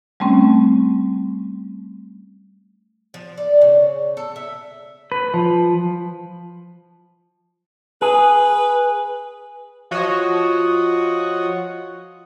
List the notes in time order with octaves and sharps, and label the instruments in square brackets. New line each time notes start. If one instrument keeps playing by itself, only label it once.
[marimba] G3 A3 C4 C#4
[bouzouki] F3
D5
C#3
A4
E5
[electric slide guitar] B4
F3
[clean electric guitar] G#4 [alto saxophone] B4
[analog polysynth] F3 F#4 C#5 D#5